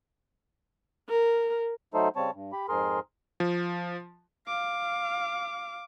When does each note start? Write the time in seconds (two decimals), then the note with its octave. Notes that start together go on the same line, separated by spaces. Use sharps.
1.09 A#4
1.94 F#3 A3 D#4 A4 C5
2.16 C#3 G3 C4 C#5 A5
2.34 G2
2.53 G4 B5
2.69 F2 G#2 G#4 A#4 C6
3.40 F3
4.48 F5 D6